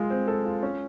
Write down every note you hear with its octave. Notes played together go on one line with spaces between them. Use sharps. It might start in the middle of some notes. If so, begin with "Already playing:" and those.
Already playing: G#3 F4
C4
A4
F4
C#4